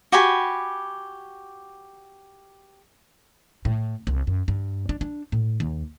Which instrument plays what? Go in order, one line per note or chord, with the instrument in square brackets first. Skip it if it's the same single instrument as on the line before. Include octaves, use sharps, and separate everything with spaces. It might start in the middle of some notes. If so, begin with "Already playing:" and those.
[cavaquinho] F#4 G4 G#5 B5
[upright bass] A2
C2
F#2
G2
D4
D4
A2
D#2